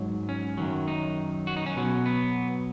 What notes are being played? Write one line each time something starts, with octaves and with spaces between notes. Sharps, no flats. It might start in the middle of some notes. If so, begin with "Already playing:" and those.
Already playing: G#2 F#3
C#4
F#2 D#3 F#3
D#4
F#4
D#4
C#4
B2 F#3
B3